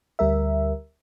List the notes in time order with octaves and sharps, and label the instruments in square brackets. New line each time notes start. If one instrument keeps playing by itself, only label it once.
[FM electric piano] D2 G3 A#4 E5